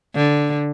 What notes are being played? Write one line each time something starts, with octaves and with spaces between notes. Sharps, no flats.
D3